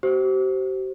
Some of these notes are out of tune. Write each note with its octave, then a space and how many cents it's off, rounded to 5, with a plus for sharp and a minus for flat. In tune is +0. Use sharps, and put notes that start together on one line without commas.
G4 -45 C5 +0